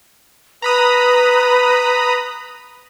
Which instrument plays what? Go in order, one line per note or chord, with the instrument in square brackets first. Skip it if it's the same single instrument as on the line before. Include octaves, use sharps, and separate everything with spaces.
[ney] B4 [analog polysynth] A#5 B5 D#6